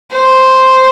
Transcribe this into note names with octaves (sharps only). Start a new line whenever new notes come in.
C5